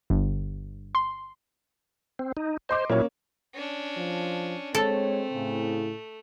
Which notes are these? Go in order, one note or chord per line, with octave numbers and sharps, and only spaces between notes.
G1
C6
C4
D#4
C5 D#5 C6 D6
A#2 F#3 A#3 C#4 E4 C#5
C#4 D4
F3
G#3 A3 C4 A4 C#5
A2 C#3